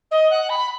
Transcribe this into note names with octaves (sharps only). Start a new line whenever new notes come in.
D#5
F#5
B5